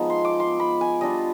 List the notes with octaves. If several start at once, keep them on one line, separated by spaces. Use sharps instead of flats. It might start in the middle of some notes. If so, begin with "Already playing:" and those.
Already playing: F3 G#3 B3 D#4
C6
D6
C6
B5
G#5
G3 D4 F4 D#5